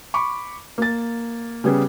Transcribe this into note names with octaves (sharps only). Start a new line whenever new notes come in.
B5 C#6 D6
A#3 A6
C#3 G3 B3 G#4